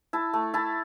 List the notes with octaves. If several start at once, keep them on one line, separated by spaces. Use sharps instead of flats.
E4 A5
A3
E4 A5